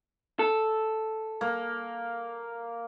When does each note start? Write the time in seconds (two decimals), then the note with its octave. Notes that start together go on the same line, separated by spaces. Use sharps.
0.39 A4
1.41 A#3